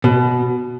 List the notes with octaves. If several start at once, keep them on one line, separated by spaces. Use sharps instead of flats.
B2